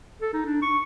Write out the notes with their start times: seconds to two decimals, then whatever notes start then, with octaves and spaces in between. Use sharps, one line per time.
0.22 A4
0.34 D#4
0.46 D4
0.63 C#6